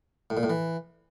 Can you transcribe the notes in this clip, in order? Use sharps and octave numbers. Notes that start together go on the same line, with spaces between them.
A2
A#2
A2
E3